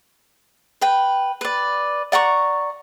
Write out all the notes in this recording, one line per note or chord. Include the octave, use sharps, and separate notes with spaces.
B4 G5
B4 D5
D5 F#5 A#5 C#6